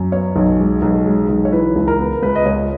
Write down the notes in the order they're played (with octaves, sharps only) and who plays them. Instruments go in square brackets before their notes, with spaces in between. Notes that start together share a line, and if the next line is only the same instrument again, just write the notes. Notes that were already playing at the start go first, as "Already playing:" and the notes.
Already playing: [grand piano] F#2
B3 C#5
B1
G#3
B1
G#3
B1
C#5
E3 B4
C#2
A#4
B3
C#2 B4
D#5
C#2 C#5